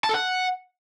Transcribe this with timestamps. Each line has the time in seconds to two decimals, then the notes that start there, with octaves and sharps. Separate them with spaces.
0.04 A5
0.09 A4
0.14 F#5